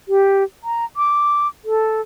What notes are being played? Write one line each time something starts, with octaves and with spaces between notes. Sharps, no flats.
G4
A#5
D6
A4